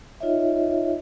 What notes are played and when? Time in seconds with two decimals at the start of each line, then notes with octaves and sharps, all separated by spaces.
0.20 D#4 F4 C#5 D#5 E5